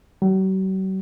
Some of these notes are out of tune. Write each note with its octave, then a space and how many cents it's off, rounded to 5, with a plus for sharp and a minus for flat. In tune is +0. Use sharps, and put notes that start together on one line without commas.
F#3 +45